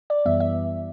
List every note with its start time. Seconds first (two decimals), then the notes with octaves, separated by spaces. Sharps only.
0.10 D5
0.25 F#2 E3 G3 B3 E5
0.40 E5